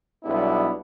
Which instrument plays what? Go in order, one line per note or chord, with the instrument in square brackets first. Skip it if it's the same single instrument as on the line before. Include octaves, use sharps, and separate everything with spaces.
[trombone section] B1 G3 B3 D4 E4